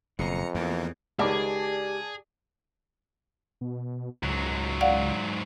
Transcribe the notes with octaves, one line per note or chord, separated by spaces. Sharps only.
F#1 F2 B2 A#5 C#7
E2 E3 A#3
C#2 D#3 G4 G#4 D5 A5 D6
B2
C#2 G#2 F#3
D5 F5 F#5